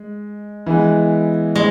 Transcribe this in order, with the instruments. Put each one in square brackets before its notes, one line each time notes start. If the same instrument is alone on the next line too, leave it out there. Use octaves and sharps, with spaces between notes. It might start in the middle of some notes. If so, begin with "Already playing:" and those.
Already playing: [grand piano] G#3
E3 G#3 B3
[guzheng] G#3